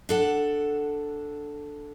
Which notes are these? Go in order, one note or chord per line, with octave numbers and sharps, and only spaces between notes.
D4 A4 F#5